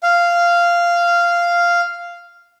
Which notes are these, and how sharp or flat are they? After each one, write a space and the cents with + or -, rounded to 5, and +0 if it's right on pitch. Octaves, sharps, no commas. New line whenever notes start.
F5 -10